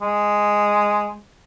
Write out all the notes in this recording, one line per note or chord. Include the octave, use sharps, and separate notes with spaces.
G#3